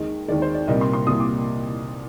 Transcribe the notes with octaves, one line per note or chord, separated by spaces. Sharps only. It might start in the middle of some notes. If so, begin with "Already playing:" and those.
Already playing: D#2 D#3 G#3 D#5
D#2 D#3 G#3 D5
C5
D5
C2 A#2 G3 A#3 D#5
C6
C6
C2 A#2 G3 A#3 D#6
D6